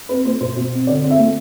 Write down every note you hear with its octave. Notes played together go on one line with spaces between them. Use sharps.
C4 B4
A3 C5
B2 C5
B2
C4
D3 D5
C4
E5
A3